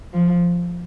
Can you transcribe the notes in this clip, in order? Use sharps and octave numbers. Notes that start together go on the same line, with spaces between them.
F3